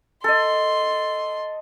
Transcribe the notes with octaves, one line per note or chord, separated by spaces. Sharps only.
A4 D#5 C6